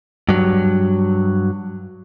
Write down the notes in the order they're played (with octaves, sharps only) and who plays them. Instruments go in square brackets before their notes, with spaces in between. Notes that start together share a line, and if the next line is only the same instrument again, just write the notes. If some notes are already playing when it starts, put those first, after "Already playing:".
[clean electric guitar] G2 F#3